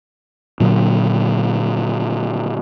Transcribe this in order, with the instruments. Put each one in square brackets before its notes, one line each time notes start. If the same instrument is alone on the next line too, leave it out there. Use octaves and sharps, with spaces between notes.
[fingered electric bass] A#2 D3 F#3